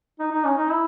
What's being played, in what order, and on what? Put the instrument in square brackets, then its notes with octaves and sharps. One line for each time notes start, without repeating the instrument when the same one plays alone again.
[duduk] D#4
D#4
C#4
D#4
E4